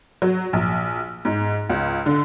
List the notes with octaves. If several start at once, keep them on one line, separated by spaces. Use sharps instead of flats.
F#3
A#1
G#2
C#2
D3